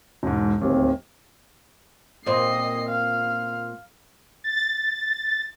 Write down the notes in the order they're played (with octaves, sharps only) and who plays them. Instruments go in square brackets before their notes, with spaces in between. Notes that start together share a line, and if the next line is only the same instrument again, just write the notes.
[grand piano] E1 G#2
[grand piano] D1 D#2 [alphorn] C4
[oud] A#2 A#3 C4 [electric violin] D#5 C7
[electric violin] F5
[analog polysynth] A6